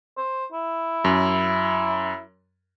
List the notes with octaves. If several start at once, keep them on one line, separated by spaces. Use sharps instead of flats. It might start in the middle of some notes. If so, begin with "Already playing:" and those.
C5
E4
F#2